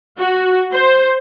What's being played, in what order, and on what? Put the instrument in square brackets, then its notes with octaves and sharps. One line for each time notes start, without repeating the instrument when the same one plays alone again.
[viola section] F#4
C5